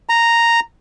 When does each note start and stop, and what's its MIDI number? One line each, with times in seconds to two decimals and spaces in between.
0.09 0.60 82